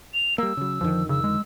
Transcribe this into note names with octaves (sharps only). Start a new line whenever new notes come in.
F7
G3 A#3 E6
C#3 F#3
F2 D3 D#3 F3
C#3 E6
G#3